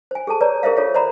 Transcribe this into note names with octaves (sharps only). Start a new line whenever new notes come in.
C5 G#5
G#4 A4 A5
B4 C#5 D5 A#5
G#4 A#4 C5 E5 F5
F4 A4 C#5 F5
C5 D5 D#5 A#5 B5